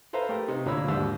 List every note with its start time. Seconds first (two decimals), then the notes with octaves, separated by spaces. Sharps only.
0.13 A4 B4 C5 E5 F5 A#5
0.29 A3 G4 A#4
0.48 C3 D#4
0.66 D2 A#2 A#3 C#5 B5 E6
0.88 D#2 G#2 G3 D4 E5 E6